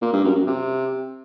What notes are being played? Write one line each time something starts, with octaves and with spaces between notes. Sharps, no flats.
A#2
G2
F#2
F#2
C3